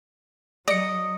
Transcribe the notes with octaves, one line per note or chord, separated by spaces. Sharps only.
F#3 D5 D#5 C#7